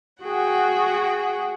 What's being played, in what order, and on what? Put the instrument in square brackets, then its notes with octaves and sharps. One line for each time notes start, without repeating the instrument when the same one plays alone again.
[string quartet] F#4 G#4 F#5 G5